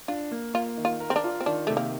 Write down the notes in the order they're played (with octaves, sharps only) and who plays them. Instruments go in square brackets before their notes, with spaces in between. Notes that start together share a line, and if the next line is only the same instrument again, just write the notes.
[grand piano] D4 [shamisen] F4
[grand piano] A#3
[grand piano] A#3 [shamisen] F4
[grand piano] D#3
[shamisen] F4
[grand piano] A#4
[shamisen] C4
D4
[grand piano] F4
[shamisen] C4
[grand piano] D#3 [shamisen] D4
[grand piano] C3 [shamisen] A3
[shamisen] A#3